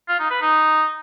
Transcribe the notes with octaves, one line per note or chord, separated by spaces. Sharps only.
F4
D#4
B4
D#4